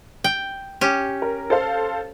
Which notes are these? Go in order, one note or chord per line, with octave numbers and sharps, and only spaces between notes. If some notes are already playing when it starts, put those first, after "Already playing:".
G5
C#4 G4
A#4
A4 C5 F5